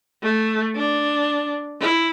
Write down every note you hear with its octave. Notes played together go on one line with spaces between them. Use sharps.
A3
D4
E4